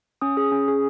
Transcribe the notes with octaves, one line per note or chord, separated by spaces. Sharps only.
C#4 D#6
G#4 D#6
C#4
G#4